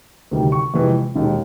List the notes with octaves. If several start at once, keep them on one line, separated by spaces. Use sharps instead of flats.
D2 C3 D#3 G3
C#6
F2 C3 E3 G#3
E1 D#2 D#3 G#3